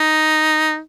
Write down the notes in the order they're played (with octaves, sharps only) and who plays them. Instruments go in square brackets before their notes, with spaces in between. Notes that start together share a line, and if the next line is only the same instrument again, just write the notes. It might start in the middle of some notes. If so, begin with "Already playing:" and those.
Already playing: [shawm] D#4